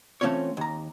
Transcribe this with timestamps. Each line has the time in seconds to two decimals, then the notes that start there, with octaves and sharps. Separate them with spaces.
0.21 E3 A3 C4 C#4 F4 C#5
0.57 D#2 A#5